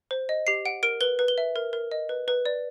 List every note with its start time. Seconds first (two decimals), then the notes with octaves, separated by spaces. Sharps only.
0.11 C5
0.29 D#5
0.47 G4 C7
0.65 F#5 D7
0.83 A#4 D7
1.01 B4 G7
1.19 B4
1.28 G7
1.38 E5
1.56 A#4
1.73 A#4
1.91 D#5
2.09 B4
2.28 B4
2.46 D5